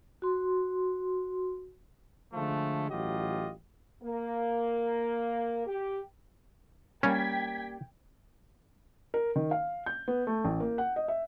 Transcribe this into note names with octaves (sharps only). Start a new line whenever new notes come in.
F#4 C6
D3 F3 G#3 A3
A1 F#3 F4 G4 D#5
A#3
G4
G3 A#3 C#4 G5 G#6 B6
A#4
D#3
F5
G6
B3
A3
A1
A#3
F#5
D#5
E5